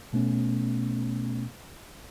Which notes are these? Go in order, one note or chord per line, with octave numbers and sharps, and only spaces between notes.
B2 A3 B3 C#4